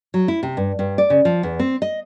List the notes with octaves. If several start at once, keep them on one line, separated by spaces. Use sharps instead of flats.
F#3
E4
C3
G2
G2
D5
C#3
F3
E2
C4
D#5